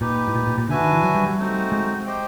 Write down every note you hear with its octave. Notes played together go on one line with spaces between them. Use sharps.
A#2 D#4 G4 B4
A2
A#2
A#2
A#2
D3 D4 F#4 B4 E5 G#5
D#3
E3
F#3
G3
G3
A3 C4 D#4 F#4
G#3
G4 C5 D#5 G5